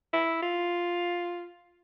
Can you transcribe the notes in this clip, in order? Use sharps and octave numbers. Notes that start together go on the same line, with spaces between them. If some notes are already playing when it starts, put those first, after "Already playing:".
E4
F4